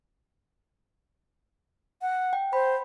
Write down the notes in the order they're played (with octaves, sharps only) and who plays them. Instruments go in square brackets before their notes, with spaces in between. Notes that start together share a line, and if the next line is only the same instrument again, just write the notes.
[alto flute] F#5
[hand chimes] G5
[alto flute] C5 [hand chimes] B5